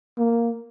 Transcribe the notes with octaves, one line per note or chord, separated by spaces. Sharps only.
A#3